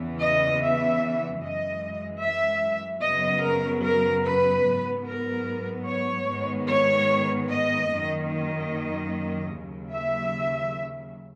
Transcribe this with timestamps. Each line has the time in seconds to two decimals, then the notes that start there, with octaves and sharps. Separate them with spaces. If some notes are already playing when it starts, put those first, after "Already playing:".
Already playing: E2 C#3 E3 B3
0.20 D#5
0.61 E5
1.41 F#2 E3 G#3 D#5
2.22 E5
3.03 F#2 C#3 F#3 B3 D#5
3.44 A#4
3.84 A#4
4.25 B4
4.65 G#2 F#3 B3
5.06 A#4
5.87 C#5
6.27 G#2 D#3 G#3 B3
6.68 C#5
7.49 D#5
7.89 F#2 D#3 A#3
8.30 D#5
9.51 D#2 C#3 F#3
9.92 E5